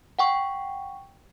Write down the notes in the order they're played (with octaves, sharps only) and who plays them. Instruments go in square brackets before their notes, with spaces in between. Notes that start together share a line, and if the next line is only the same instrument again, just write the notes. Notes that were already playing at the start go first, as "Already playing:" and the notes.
[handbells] F#5 G5 C#6